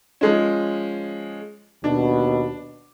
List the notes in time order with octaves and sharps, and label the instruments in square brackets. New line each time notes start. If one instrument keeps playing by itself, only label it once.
[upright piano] F3 G#3 C#4
[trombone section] D#2 B2 [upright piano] D4